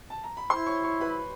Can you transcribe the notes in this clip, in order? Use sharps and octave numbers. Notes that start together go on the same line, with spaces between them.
A5
A#5
B5
E4 C5 C6
C#5 C#6
C#5 C#6
B4 B5